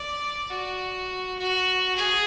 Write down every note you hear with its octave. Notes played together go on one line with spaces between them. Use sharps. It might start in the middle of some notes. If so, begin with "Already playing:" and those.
Already playing: D5
F#4
F#4
G#4